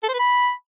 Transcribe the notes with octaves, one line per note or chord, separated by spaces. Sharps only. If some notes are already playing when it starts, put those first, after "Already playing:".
A4
C5
B4
B5